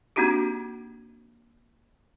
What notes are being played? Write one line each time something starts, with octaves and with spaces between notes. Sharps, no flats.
A#3 C4 D4 D#4 F#4 G4